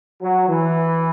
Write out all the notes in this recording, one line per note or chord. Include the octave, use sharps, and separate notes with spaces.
F#3
E3